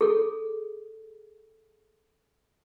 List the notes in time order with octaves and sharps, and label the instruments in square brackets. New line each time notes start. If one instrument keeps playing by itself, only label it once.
[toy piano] G#4 A4